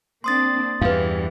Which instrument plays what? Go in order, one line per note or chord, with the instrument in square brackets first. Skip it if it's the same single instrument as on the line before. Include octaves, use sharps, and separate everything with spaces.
[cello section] A#3 C4 D4 [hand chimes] C6 D#6 A6
[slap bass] E2 G2 [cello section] E3 [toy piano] B4 F5